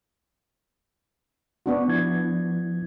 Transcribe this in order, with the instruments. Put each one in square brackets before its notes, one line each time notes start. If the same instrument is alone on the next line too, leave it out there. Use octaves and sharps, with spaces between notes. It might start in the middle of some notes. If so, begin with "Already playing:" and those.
[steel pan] B3 D4 F#4
[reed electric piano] F3 E4 G#6